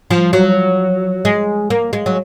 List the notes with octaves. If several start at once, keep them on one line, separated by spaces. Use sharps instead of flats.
F3
F#3
G#3
A#3
G#3
F#3